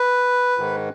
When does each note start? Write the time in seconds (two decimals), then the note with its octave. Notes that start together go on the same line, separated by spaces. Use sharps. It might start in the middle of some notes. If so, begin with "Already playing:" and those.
Already playing: B4
0.58 G#2 D#3